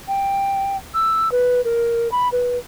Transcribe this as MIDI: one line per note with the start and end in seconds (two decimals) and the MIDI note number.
0.08 0.76 79
0.94 1.31 88
1.32 1.63 71
1.64 2.11 70
2.12 2.28 83
2.32 2.58 71